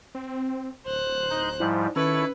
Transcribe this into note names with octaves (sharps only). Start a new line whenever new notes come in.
C4
D1 C5 F#6
D#4 G6
G#2 F3 G3 E4
D#3 C#4 E4 A4 B4 C#5